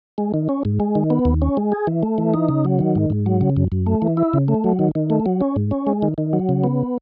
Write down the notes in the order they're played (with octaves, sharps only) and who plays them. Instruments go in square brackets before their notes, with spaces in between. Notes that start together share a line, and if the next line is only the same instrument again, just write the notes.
[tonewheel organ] G#3
D#3
C#4
G#2
G#3
D#3
B3
D#2
C#4
G#3
G#4
E3
A3
E3
D#4
C#3
F#3
D#3
G#2
G#2
F#3
C#3
F#2
F#2
A3
E3
E4
C#3
A3
F#3
D#3
D#3
A3
F#3
C#4
G#2
C#4
G#3
D#3
D#3
F#3
C#3
B3